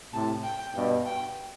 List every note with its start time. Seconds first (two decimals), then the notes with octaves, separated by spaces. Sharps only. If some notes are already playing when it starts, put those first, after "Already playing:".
0.13 A2 C3 A5
0.44 G5
0.75 G2 B2
1.06 G5